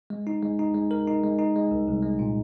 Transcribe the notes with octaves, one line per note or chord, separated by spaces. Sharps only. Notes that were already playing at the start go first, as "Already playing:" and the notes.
G#3
D#4
G#3
D#4
G#3
A#4
D#4
G#3
D#4
G#3
C2
C2
G#3
A#2